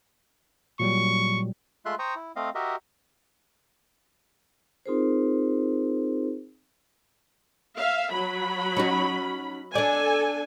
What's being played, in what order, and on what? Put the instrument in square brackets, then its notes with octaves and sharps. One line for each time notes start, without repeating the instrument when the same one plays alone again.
[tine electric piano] A#2 F#3 G3 [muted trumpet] C#6
[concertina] G#3 A3 F4 E5 C6 F#6
C5 G5 A#5 C#6 D#6
E4
A3 C4 D#5 F5
F#4 G4 A#4 D#5 E5
[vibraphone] C4 D#4 F4 G#4 A#4 C5
[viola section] E5 F5
F#3 B5
[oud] C#4 D#4 F#4
[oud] D4 D5 [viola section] A4 G#5